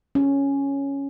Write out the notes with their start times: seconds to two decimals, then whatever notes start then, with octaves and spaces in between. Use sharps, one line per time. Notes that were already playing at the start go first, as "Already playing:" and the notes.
0.15 C#4